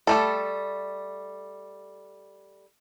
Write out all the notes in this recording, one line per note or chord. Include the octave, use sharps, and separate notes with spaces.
G3 A3 A4